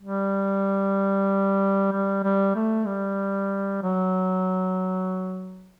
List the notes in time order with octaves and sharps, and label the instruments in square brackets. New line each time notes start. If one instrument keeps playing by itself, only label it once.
[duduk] G3
G3
G3
A3
G3
F#3